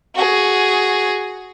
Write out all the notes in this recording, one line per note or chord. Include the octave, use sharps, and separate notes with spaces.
F#4 G#4